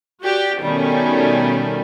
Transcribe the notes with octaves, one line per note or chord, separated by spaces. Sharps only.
F#4 G4 D5
B2 D#3 G3 A3 C#4